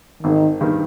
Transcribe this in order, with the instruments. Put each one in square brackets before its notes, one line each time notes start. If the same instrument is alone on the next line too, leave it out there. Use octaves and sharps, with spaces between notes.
[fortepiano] G#1 [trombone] D#3
[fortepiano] G2 D#3